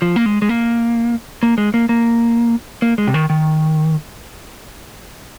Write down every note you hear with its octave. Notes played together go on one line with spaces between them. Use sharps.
F3
A#3
G#3
G#3
A#3
A#3
G#3
A#3
A#3
A#3
G#3
C3
D#3
D#3